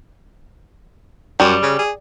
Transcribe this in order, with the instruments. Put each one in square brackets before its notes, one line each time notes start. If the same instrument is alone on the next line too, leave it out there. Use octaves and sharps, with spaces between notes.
[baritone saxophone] F#2 [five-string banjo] G3
[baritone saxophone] C#3
G#4